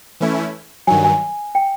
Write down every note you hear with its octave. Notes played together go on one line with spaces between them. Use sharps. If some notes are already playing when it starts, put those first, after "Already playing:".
E3 A3 C#4 E4
G2 D#3 F#3 G#5
G#5
G5